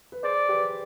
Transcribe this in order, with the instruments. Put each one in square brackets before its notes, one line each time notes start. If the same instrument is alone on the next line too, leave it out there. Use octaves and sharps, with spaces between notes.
[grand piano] B4
[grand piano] G#4 C5 [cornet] D5
[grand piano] G4 B4